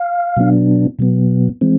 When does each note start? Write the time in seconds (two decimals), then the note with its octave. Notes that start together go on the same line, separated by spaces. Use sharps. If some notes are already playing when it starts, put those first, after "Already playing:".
Already playing: F5
0.37 B2 F#3 B3 D4
0.99 B2 F#3 B3
1.61 E3 G#3 C4